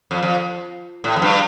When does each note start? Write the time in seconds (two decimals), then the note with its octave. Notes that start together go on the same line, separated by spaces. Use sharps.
0.11 F2
0.23 F2
1.04 A2
1.16 F2
1.22 G2